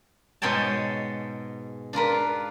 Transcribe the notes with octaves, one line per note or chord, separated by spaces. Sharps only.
G#2 B2 G#3 C#5 G5 A5
D4 F4 A#4 B4